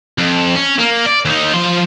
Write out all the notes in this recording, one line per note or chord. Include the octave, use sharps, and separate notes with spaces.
F2
C#4
A#3
D5
D#2 D#4
F3 C6